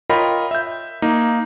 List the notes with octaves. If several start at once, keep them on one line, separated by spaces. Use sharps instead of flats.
F4 A#4 C#5 D#5 G5 B5
E5 G6
A#3 D#4